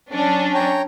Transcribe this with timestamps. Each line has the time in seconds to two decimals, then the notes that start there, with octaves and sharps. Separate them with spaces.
0.14 F#3 C#4 D4
0.54 C#5 G5 A#5